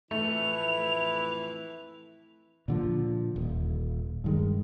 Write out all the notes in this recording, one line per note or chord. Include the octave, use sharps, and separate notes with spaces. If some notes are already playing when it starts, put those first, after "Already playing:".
F2 A2 E3 A3 E4 F7
A#2 D3 F3
D#1
G2 D#3 G#3